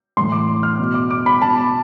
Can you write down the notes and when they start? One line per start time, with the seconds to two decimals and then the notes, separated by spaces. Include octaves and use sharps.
0.17 A2 E3 C6
0.32 D6
0.63 F6
0.79 B2
0.94 D6
1.10 D6
1.26 B5
1.41 B2 A5